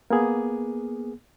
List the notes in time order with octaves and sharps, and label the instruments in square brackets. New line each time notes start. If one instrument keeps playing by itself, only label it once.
[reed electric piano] A#3 B3 G#4